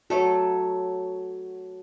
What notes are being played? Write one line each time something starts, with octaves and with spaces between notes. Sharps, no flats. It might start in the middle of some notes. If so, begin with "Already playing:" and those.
F#3 A3 F#4 A4 C#5